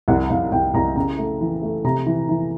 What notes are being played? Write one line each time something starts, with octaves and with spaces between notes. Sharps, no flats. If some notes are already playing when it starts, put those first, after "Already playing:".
C2 F#5
C2 F5
C2 G5
C2 A#5
C#3 A#5
A3
E3
A3
C3 A#5
E3
E3